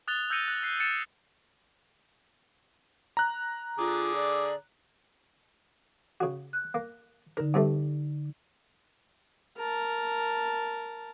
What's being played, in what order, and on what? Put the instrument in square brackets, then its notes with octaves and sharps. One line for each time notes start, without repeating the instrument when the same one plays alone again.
[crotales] D#6 F#6 A6 F7 G7
E6 G6 A#6 C#7 D#7 G7
F#6
F#6 C7
A6 C#7 E7
[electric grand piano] A#5 F#6
[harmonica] D3 D6 [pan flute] F4 [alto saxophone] G#4
[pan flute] D5
[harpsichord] C#3 F#4
[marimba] F#6
[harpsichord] A#3
[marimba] D3 D#4 [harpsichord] A#4
[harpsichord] G2 C3 A3
[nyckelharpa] A#4 A5